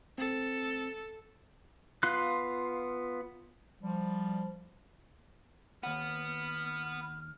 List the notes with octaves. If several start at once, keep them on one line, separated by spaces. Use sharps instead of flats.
C4 A4
B3 F4 F5 C6 F#6
F3 G3
D#2 B3 F#5 F6